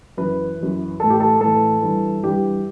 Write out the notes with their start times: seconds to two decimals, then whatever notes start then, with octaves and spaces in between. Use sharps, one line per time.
0.17 F#2 E3 B4
0.59 F#2 E3
1.00 A2 E3 A4
1.10 G4
1.20 A4
1.41 A2 E3 A4
1.82 G2 E3
2.23 G2 E3 G4